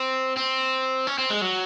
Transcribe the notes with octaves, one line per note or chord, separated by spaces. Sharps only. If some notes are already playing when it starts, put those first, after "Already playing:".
Already playing: C4
C4
C#4
C4
G#3
F#3